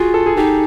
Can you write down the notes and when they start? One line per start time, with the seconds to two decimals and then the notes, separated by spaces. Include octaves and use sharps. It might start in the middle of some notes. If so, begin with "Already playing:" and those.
Already playing: F4 F#4 G#4
0.14 A4
0.26 G#4
0.36 D#4 G4 A4